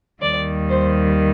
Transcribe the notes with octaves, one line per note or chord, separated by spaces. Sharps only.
D#2 D#3 G3 D5
C5